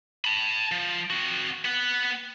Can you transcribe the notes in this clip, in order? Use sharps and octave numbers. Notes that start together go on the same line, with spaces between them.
A5 B5
F3
C4 F#4
B3 F#5